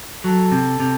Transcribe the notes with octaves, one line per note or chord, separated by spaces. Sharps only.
F#3 A4
C3
C3